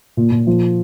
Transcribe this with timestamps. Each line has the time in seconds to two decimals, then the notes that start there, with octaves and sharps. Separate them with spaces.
0.17 A#2
0.32 A#2
0.47 F3